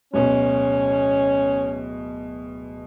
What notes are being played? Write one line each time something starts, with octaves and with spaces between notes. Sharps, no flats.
D1 B2 C#4